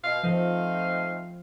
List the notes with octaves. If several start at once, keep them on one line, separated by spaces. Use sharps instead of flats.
B2 F5
F3 A3 C4 D#4 F5